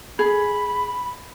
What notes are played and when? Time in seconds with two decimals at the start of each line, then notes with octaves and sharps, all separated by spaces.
0.19 G#4 B5